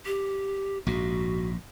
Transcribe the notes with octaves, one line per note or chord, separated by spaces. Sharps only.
G4
A#1 G#2 F#4